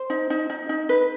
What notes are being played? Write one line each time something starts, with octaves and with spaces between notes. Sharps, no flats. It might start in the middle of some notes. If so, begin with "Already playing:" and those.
Already playing: C5
D#4
D#4
D#4
D#4
B4